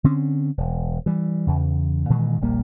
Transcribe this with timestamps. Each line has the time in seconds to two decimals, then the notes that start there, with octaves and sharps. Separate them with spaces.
0.04 D3 C4 C#4
0.58 E1
1.06 E3 G3
1.47 E2 C#3
2.10 A#2 D#3 E3 G#3
2.41 D#1 A#1 G3 A#3